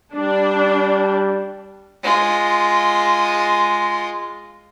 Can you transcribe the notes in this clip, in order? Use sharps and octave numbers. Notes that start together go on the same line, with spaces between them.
G3 D4
G#3 F4